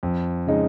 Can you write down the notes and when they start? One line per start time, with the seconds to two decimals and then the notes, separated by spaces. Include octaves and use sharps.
0.03 F2
0.47 C#3 G#3 D#4